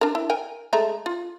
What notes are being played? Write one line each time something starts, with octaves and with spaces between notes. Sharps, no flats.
D4 A#4
E4
A#4 G5 G#5
G#3 A3 A#5
F4